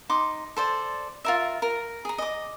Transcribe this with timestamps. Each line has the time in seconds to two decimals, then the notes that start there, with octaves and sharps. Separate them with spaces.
0.09 D#4 C6 D6
0.57 A4 C5 D5
1.25 F4 A#4 E5
1.62 A#4
2.05 G#4 A#5
2.18 D#5 D6